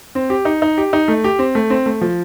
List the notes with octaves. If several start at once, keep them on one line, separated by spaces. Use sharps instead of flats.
C4
G4
D#4
D#4
G4
D#4
A3
G4
C4
A3
C4
A3
F3